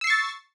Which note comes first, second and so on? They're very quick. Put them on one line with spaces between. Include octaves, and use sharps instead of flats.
E6 C7 C#6 A6